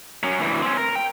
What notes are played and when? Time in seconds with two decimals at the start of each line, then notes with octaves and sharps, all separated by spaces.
0.23 F#3 C#4
0.39 D2 E3
0.63 C4 C#4
0.77 A#4
0.96 G5